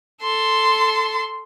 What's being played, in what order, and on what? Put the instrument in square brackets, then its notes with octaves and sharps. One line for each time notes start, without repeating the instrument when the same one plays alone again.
[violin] A4 C6